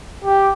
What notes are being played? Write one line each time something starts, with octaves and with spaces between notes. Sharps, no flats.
G4